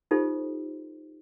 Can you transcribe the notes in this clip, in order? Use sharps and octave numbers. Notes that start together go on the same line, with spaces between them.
D#4 F4 G4 A4 C5